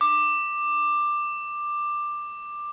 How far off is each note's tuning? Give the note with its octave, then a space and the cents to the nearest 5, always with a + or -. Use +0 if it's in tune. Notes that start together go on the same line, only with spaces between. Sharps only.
D6 +15